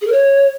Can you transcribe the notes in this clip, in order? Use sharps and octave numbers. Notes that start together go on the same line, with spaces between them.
G#4
A#4
C#5